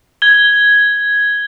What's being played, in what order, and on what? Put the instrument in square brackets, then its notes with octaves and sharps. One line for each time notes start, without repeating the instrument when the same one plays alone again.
[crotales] G#6 G7